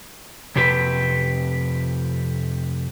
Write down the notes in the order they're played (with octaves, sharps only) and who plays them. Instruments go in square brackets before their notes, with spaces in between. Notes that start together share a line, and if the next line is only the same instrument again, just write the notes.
[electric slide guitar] F2 C3 G4 B4